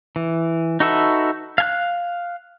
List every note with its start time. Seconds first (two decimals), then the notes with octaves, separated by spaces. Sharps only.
0.16 E3
0.80 D#4 F#4 A4 B4 E5
1.58 F5 G#5 F#6